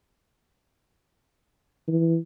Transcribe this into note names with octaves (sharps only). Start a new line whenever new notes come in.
E3